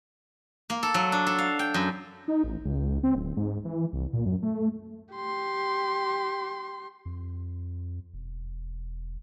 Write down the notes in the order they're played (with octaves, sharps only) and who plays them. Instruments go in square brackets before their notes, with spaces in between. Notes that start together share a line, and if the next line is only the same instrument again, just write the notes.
[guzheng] A#3
A4
F#3
D4
A4
F5
G5
F#2
[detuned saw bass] D#4
A1
C#2
C4
D1
G#2
E3
C2
A#2
F#2
A3
[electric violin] G4 C6
[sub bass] F2
E1